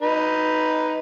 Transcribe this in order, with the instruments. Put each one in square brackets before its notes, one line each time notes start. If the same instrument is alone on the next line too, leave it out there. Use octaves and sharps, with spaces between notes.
[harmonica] D#4 B4